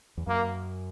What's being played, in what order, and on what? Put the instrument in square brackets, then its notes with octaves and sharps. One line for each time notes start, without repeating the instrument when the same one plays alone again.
[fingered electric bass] E2
[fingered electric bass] F#2 [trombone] A#3